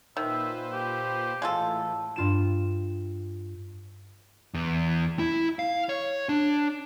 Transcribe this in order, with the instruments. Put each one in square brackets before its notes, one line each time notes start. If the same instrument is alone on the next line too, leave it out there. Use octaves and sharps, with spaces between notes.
[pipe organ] A#2 B4 C5 [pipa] D#3 [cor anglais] E5
[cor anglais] G4
[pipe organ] A2 E3 [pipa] G#3 F4 A4
[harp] G2 F4 E7
[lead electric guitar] E2
E4
F5
C#5
D4